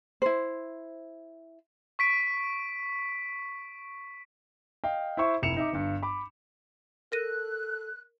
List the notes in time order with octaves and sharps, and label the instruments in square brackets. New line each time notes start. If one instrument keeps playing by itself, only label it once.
[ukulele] E4 C5
[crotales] C#6 B6 D7
[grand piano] D#5 F5 G5
E4 C5 E5 C#6
F1 E4 C#7 E7 F7
D#4 E5 D6
G1 G2
B5 D6
[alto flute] A4 [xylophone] A#4 A#6 D#7 [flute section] F#6